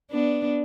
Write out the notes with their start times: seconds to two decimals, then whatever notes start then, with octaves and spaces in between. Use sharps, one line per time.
0.11 B3 D4